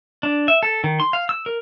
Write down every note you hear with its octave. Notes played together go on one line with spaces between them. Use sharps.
D4
E5
A4
D#3
C6
F5
E6
A#4